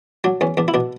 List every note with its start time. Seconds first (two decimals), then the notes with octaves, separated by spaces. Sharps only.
0.24 F#3 D4
0.41 E2 C#4
0.57 E2 D4
0.68 E4
0.74 B2 D4